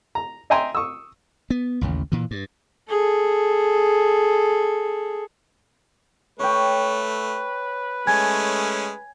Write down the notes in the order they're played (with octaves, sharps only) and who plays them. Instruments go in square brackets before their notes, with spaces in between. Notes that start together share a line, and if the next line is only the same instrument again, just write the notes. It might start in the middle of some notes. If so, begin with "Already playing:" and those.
[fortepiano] A#5
D#5 E5 G5 G#5 A#5 C6
C#6 D#6 E6
[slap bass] B3
A1 D#2 C#3
A#2 E3
G2
[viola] G#4 A4
[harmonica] A3 [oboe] B4 [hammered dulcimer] C#5 G5
[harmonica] G#3 A3 C#4 [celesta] G#5 G#6